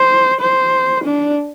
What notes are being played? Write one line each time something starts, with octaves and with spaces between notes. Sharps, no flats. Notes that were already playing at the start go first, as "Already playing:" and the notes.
Already playing: C5
C5
D4